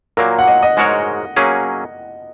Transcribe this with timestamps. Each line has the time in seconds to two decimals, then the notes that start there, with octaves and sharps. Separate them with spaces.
0.17 A#2 F#3 A#3 A#4
0.39 F#5
0.47 D#5
0.62 D#5
0.77 G#2 G#3 F#4 A#4 C#5
1.36 F#3 A#3 C#4 G#4